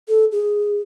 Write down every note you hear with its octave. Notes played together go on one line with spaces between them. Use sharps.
A4
G#4